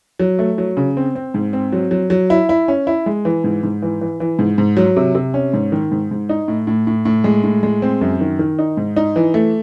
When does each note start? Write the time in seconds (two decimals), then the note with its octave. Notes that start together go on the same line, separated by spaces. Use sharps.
0.19 F#3
0.39 A3
0.58 F#3
0.77 C#3
0.97 C4
1.15 C4
1.34 G#2
1.53 C4
1.72 F#3
1.91 F#3
2.10 F#3
2.30 E4
2.49 E4
2.68 C#4
2.87 E4
3.06 G#3
3.25 E3
3.44 G#2
3.63 G#2
3.82 E3
4.01 E3
4.20 E3
4.39 G#2
4.58 G#2
4.77 F#3
4.97 C3
5.15 C3
5.34 C#4
5.53 G#2
5.72 D#3
5.91 G#2
6.11 G#2
6.29 D#4
6.48 A2
6.67 A2
6.87 A2
7.05 A2
7.24 G#3
7.44 A2
7.63 G#3
7.82 C4
8.01 F#2
8.21 D#3
8.39 D#3
8.59 D#4
8.77 G#2
8.96 D#4
9.16 E3
9.34 A3